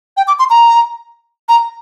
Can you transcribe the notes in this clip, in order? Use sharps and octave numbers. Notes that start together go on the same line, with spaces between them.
G5
D6
C6
A#5
A#5